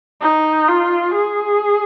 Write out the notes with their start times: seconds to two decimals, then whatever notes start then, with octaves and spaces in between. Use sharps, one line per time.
0.22 D#4
0.68 F4
1.15 G#4